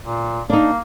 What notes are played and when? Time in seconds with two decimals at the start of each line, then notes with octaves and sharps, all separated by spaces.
0.02 A#2
0.50 A#3 D4 D#4